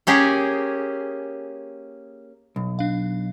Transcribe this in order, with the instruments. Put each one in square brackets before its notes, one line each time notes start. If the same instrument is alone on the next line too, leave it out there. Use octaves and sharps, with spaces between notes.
[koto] A#3 C#4 G4 G#4
[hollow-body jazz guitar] B1
[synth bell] D4 F5